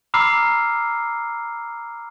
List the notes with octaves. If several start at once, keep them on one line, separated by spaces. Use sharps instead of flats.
A#5 B5 D6 E6 F6 C7